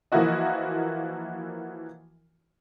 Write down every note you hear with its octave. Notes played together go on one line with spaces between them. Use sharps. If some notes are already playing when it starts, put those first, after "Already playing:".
E3 F3 A#3 E4 F#4 D#5